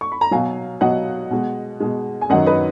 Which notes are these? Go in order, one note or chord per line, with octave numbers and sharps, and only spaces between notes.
C#6
B5
A#5
B2 F#3 F5 G#5
B2 F#3 D#5 F#5
B2 G#3
B2 G#3
G#5
F#2 D#3 F#3 D#5 F#5
B4 D#5